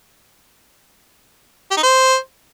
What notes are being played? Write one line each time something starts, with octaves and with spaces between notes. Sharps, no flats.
G4
D#4
C5